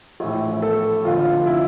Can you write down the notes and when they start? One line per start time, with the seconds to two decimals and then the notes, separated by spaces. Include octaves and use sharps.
0.20 A#1 A2 E3
0.62 A4
1.05 F1 F2 D3 F4
1.46 E4